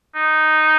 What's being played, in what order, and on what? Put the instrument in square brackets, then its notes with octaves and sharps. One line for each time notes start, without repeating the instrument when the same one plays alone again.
[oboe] D#4